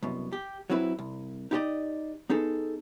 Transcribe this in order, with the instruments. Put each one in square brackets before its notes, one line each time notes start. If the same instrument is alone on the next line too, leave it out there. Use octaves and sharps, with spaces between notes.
[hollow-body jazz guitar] C2 F#2 B2
G4
F#3 C4 E4 B4
C2
D#4 E4 G4 A4 D5 D#5
B3 D#4 G#4 A4